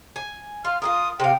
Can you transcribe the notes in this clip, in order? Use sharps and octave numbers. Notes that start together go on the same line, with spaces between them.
G#5
F4 F6
F4 G#4 A#4 D#6
C3 F5 G5